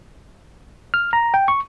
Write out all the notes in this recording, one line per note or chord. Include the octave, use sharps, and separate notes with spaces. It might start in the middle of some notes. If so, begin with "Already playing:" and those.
F6
A#5
G5
C#6